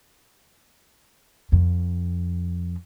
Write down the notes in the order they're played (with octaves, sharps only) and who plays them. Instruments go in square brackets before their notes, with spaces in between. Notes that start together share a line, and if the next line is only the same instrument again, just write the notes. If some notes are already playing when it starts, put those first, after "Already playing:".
[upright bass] F2